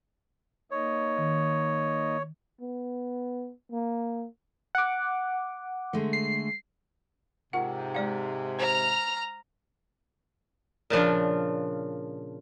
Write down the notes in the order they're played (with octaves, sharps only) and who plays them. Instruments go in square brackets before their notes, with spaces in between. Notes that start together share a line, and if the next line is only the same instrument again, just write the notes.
[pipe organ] A#3 D#4 D#5 [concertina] C#5
[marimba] D#3
[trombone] B3
A#3
[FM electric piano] F#5 D6
[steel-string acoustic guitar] D3 G#3 A3
[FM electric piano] C7
[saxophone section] G#2 C3 [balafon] F4 A#4 F#5
[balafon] G#3 D5 F5
[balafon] C5 [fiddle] A#5 F6
[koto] A#2 C#3 F3 D4